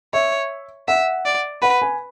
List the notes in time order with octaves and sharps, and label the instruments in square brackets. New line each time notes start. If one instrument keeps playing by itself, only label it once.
[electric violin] C#5 [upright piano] E5
[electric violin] E5 [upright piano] F#5
[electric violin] D5
[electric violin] B4 [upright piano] F#5
[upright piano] G#5